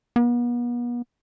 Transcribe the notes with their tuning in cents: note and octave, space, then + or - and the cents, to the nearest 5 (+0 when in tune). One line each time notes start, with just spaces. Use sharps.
B3 -40